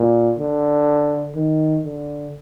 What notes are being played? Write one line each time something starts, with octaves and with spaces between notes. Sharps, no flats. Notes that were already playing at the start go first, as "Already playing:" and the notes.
Already playing: A#2
D3
D#3
D3